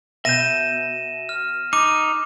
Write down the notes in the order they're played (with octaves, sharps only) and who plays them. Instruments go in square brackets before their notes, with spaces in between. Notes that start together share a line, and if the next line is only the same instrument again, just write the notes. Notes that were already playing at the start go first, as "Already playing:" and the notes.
[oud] B2 [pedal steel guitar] E5 G6 [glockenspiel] A#6 D#7 E7
[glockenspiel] F6
[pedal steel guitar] D#4 [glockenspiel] D6